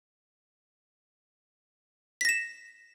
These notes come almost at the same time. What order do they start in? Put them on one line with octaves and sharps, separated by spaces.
B6 A#6 E7